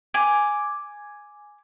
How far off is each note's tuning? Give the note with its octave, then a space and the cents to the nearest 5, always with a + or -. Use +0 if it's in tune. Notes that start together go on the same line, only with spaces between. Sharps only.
G#5 +0 D6 +0